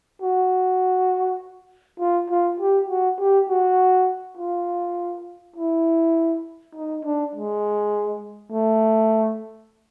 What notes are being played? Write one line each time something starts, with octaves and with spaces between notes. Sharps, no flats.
F#4
F4
F4
G4
F#4
G4
F#4
F4
E4
D#4
D4
G#3
A3